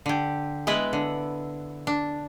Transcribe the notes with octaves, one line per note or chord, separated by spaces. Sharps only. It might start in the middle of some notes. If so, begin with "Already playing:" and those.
D3 G4
G#3 B3 E4 B4
D3
D4